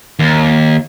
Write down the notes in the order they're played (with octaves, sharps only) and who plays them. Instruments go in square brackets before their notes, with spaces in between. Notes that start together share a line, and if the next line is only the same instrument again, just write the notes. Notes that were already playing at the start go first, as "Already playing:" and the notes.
[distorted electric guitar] D#2